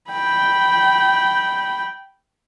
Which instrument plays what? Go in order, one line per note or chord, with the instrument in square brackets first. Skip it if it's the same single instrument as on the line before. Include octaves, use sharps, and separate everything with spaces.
[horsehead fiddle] G5 B5